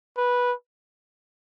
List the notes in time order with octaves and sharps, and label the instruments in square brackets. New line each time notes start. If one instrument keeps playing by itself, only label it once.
[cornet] B4